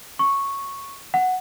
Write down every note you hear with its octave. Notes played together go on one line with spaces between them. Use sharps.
C#6
F#5